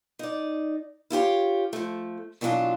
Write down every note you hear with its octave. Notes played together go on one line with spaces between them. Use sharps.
D#4 D5
E4 F4 G4 C#5
F3 A3
B2 E3 F#3 D4 F4 A5